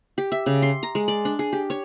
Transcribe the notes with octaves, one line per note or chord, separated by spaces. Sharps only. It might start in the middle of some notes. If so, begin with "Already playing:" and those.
G4
E5
C#3
C6
A#5
G#3
D5
D4
G#4
G4
C#5